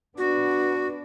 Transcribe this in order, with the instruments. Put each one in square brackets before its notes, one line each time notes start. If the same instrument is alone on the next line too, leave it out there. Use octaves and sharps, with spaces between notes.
[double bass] B3 D4 [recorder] F#4